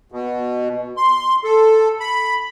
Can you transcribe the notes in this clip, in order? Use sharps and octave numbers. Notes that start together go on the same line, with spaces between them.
B2
C6
A4
B5